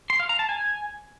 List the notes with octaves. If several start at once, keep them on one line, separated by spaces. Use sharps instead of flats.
C6
F5
A#5
A5
G#5